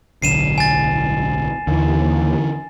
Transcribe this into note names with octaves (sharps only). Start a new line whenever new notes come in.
D1 B1 D3 C7 D#7 E7
G#5 A6
D#2 D3 E3